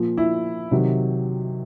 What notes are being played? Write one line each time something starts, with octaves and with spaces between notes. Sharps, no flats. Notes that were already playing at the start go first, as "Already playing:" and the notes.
Already playing: A#2 F3
E4
C3 D#3 F#3